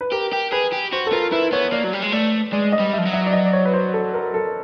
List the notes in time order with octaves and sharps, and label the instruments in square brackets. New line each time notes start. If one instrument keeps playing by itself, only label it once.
[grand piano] B4
[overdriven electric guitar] G4 [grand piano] A#4
[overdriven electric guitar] G4
[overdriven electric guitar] G#4 [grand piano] B4
[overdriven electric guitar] G4
[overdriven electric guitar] F#4 [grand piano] C5
[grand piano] A4
[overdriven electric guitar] F4 [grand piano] A#4
[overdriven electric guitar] E4 [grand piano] B4
[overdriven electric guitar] B3 [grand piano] C#5
[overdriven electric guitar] A#3 [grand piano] D5
[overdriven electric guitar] F#3
G3
G#3
[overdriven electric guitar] A3 [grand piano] D5
[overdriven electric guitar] G#3 [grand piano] D5
[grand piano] D#5
[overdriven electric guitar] G3
[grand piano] E5
[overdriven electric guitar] F3
F#3
[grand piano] E5
D5
D#5
D5
C#5
B4
C5
A4
A#4
A4